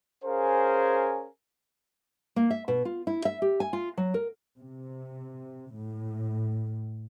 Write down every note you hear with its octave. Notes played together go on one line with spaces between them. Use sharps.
C#4 G#4 A#4 C5 F5 G#5
A#3
E5
B2
F4
E4
E5
G4
G#5
F4
F#3
A#4
C3
A2